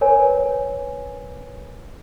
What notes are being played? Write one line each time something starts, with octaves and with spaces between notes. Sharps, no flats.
A#4 B4 C#5 G#5